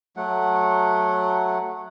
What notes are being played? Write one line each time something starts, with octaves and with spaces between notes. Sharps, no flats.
F#3 A3 F#5